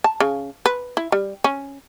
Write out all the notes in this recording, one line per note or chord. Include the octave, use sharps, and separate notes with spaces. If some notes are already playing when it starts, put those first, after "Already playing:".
A5
C#3
B4
E4
G3
C#4